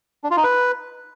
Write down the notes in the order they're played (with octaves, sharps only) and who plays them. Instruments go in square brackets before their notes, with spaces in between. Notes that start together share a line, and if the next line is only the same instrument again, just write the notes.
[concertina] D4
F4
D#4
B4